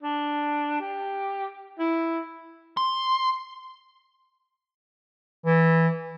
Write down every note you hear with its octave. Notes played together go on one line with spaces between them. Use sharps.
D4
G4
E4
C6
E3